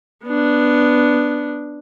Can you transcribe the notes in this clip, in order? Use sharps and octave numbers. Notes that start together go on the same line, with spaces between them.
B3 D4